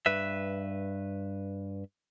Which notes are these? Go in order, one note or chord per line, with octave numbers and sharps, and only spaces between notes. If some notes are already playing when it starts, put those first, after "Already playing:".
G2 B4 E5